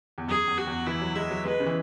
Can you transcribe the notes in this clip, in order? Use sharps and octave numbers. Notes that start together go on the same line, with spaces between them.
E2
F#2 G#4
E2
F#4
E2
E3 E4
F#3
G#3 E5
F#3
G#3 B4
C#3
E3